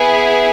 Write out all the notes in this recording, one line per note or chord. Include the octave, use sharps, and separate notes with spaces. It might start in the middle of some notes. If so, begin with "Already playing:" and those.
Already playing: B3 E4 G#4